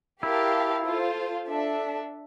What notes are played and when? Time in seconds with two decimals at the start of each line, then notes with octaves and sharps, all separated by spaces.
0.23 E4 G4 A#4 F5 A5
0.84 F4 A4 C5
1.47 D4 A4 E5